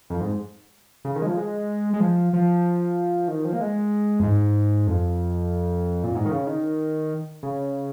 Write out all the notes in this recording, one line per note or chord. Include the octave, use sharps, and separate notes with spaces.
F2
G#2
C#3
D#3
G#3
F3
G#3
G#3
F3
F3
D#3
F3
A#3
G#3
F2
G#2
F2
A#2
G#2
D#3
C#3
D#3
C#3